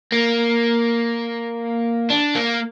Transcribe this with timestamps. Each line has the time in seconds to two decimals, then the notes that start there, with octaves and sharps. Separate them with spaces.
0.12 A#3
2.10 D4
2.35 A#3